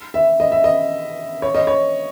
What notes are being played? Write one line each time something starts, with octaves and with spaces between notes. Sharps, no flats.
E5
D#5
E5
D#5
C#5
D#5
C#5